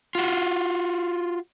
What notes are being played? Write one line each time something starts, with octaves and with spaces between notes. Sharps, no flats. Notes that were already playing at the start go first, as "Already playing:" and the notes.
F4 F#4